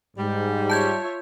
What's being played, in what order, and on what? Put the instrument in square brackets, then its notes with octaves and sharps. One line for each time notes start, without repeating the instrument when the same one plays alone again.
[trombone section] G#2 [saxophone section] G3
[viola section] F4 C#5 E5 [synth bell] A5 G6 G#6